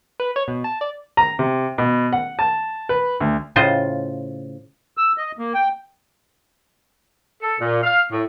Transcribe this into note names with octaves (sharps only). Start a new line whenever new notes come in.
B4
C#5
B2
A5
D5
A#5
C3
B2
F#5
A5
B4
D2
A2 C#3 F4 C5 D#5
E6
D#5
A#3
G5
A4
A#2
F5
A2